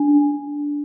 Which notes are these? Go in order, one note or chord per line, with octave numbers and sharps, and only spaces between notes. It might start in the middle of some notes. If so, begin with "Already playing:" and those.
Already playing: D4